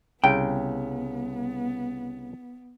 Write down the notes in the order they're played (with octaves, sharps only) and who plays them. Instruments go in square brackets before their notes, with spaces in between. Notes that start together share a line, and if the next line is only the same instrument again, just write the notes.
[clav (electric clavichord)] C2 C#3 [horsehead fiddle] B3 [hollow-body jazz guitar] G5